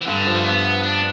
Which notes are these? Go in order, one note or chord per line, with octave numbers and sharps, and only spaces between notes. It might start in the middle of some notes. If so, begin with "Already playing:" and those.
E3
G2 D3
F3
A3
B3
D4